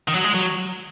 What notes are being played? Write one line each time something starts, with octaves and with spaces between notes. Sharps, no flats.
D#3
F#3
G#3
F#3